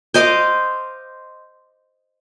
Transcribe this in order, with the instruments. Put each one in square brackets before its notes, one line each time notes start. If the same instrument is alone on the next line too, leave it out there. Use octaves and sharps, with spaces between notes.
[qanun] C5 D#5 F5 D6